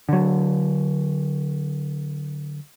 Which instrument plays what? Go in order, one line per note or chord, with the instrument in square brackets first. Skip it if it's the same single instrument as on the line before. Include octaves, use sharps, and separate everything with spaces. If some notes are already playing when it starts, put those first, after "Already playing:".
[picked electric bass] D3 F#3